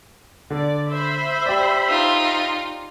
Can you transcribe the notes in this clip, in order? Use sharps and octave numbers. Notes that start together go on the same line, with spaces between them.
D3 D5
C5 E5 B5
G4 D5
D#4 F4